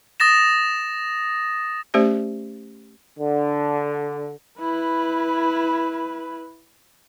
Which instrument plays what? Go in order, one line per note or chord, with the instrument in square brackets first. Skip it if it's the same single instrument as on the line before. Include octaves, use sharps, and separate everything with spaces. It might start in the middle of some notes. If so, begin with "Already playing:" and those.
[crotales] D#6 A6 A#6 E7
[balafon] A3 C#4 G4 C5 D5
[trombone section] D3
[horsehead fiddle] E4 B4